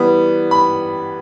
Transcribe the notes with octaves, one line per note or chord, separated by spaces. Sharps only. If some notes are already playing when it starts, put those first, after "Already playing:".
Already playing: E3 G3 B3
B5